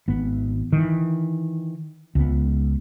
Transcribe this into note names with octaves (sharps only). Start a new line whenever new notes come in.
G#1 B3
D#3 E3
C#2 B3